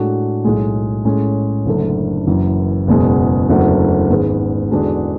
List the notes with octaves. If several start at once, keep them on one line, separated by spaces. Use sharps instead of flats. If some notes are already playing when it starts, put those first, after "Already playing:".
Already playing: A2 G#3 D4 F#4
B1 A2 G#3
A2 G#3 C#4
F#1 F#2 D3 A3 D4
F#1 F#2 E3
F#1 E2 B2 G#3
F#1 E2 D3 F#3 A3
G#1 G#2 G#3 B3
E2 D3 G#3 D4 F#4